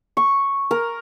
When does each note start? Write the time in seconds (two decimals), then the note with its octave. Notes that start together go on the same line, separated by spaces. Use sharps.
0.17 C#6
0.71 A#4